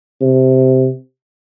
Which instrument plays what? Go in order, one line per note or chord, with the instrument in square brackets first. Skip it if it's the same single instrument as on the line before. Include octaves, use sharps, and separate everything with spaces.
[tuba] C3